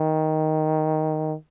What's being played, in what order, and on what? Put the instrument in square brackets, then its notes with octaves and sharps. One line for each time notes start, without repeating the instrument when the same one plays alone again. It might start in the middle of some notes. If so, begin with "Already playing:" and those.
Already playing: [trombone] D#3